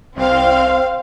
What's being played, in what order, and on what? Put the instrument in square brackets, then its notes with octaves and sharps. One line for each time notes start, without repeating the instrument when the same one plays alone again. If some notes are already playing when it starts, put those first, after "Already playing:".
[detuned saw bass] C2 [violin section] C4 F5